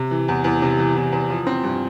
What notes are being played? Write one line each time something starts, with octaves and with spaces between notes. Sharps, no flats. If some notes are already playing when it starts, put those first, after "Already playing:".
Already playing: C3
E3
E2
E2
C3
E3
E2
E2
F3
C4
G2